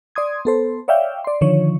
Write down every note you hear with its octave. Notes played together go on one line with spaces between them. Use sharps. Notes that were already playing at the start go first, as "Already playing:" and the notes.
D5 C6 D#6 G#6
B3 A4 C5
C#5 D5 E5 F5 G5
D5 C6
D3 D#3 F3 C#5